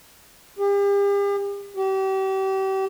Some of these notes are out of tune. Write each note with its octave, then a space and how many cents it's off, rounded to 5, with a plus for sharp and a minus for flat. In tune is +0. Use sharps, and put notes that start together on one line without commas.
G4 +40
G4 -35